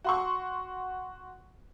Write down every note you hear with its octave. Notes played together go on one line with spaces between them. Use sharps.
F#4 C6 C#6